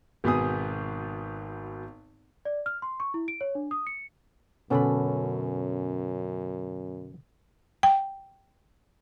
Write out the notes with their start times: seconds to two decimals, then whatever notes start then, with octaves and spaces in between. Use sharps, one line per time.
0.24 G#1 B2 B3 G#4 D#6
2.45 D5
2.66 F6
2.82 C6
3.00 C#6
3.14 E4
3.28 D7
3.41 C#5
3.55 D4
3.71 D#6
3.87 C#7
4.70 F#2 B2 D3 B3 C#4 A4 B5
7.83 G5